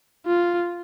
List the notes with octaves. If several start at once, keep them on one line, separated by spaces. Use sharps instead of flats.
F4